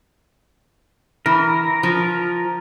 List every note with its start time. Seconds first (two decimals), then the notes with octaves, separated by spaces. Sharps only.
1.26 E3 A#4
1.83 F3